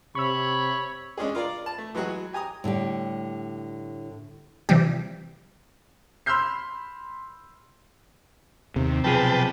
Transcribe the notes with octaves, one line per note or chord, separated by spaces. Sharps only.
C3 C#5 B5 C#6 E6
G#3 C#4 D4 G#4
F4 A#4 D5
A5
A3
E3 F#3 G#3 F#4 G#4
G4 G#5 A#5 D#6
A2 D3 G3 G4
C3 E3 F3 G3 G4
B5 C6 E6 F6 G6 C7
D#2 C3
B1 F3 G#4 B4 G5 A5